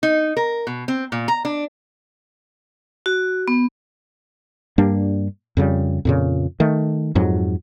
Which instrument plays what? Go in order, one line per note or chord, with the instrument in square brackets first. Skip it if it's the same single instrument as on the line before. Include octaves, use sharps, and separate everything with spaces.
[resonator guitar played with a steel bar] D#4
A#4
B2
C4
A#2
A#5
D4
[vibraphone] F#4
B3
[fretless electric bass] G2 G3 A#3 D4
F2 C#3 G3
F2 A#2 C#3
D#3 A3
F2 G#2 F#3